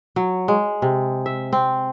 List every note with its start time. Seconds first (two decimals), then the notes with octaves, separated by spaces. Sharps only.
0.16 F#3
0.48 G#3
0.82 C3
1.26 E5
1.53 C4